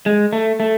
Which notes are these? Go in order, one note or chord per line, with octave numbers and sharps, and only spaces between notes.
G#3
A3
A3